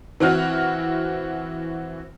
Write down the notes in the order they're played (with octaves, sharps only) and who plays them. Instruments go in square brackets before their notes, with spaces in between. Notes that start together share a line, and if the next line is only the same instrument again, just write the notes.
[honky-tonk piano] E3 C4 F#4 F6